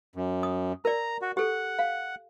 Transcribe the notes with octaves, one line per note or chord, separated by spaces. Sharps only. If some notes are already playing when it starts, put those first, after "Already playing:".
F#2
D#6
A#4 D5 A#5
F#4
G4 A4 F#5
F5